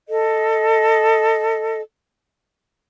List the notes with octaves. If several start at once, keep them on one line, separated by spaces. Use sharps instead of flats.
A4 D#5